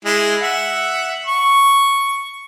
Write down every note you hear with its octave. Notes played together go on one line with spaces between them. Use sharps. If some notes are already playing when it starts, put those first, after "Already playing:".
G#3 E4
E5 F#5
C#6